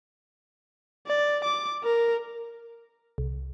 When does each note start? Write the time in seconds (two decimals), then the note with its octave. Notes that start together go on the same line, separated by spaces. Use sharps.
1.07 D5
1.44 D6
1.84 A#4
3.18 C2